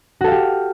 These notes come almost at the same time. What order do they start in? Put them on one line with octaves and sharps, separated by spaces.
F#4 A4 F5 G4